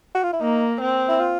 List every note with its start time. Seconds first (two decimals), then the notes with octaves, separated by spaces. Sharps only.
0.15 F#4
0.23 F4
0.33 E4
0.41 A#3 D#4
0.81 C4
1.09 E4
1.19 F4